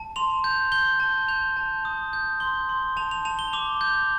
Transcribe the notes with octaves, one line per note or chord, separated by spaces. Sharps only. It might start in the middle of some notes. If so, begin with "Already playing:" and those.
Already playing: A5
C6 F7
G6
G6 G7
A5
G6 F7
A5
D#6
G6
C6 G7
C6
A5 F7
F7
A5 F7
G7
D6 F7
G6